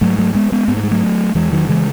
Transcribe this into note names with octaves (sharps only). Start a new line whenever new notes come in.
G#2 F#3 A3
F#3 A3
G#3 B3
G#3 B3
G#2 B3
A3
G#3
F#3 A3
E2 E3 G#3
D#3 F#3
C#3 E3 G#3